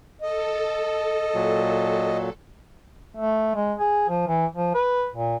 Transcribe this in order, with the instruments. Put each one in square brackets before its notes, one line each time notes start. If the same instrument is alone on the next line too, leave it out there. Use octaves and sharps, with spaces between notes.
[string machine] A4 [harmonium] D#5
[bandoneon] A#2 F#3
[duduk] A3
G#3
G#4
F3
E3
F3
B4
A#2